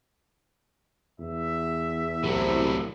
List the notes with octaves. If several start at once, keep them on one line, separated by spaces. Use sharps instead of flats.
E2 E5
C2 A2 F#3